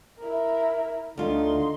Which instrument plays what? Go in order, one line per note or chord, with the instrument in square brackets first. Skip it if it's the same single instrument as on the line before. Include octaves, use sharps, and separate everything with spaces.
[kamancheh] E4 A#4
[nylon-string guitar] D2 F4 [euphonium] D3 [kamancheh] D#4 C6